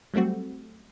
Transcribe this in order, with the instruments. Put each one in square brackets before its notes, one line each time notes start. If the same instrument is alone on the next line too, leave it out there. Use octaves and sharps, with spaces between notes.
[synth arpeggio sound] F#3 G3 A3 C4 F#4